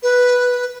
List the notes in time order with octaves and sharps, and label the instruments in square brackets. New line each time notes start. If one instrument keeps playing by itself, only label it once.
[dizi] B4